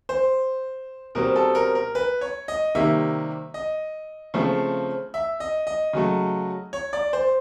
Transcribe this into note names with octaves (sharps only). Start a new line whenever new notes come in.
C5
B2 G3 C4 A#4
A4
A#4
A#4
B4
C#5
D#5
C3 D#3 G3 A#3 E5
D#5
C#3 F3 A3 C4
E5
D#5
D#5
C#3 F#3 A3
C#5
D5
C5